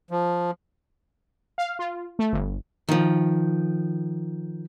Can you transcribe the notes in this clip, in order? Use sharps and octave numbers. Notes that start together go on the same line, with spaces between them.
F3
F5
F4
A3
G1
D#3 F3